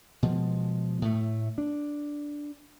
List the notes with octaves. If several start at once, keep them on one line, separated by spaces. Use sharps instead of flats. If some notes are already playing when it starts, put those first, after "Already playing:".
B2 F3 G#3
A2 A3
D4